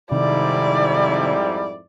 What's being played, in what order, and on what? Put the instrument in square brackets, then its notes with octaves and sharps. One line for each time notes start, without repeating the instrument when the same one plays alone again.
[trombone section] F2 G#2 E4 [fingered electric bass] C3 D#3 [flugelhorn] G3 [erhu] D5